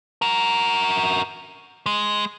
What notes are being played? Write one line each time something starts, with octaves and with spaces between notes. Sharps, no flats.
F#4 A#4
G#3